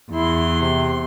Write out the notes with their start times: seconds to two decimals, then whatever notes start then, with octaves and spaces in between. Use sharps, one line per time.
0.11 E2 E4 C6
0.60 C3